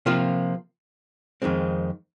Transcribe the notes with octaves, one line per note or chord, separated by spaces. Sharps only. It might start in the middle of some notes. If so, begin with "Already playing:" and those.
C3 F3 A#3 F4
F2 D#3 G#3 C4